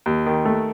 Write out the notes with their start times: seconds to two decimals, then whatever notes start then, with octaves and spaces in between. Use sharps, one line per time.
0.06 D#2
0.26 D#3
0.45 A3